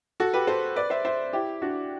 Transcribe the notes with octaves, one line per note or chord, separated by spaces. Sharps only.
F#4 A4
G4 B4
A4 C5
B4 D5
C5 E5
C5 E5
E4 G4
D4 F#4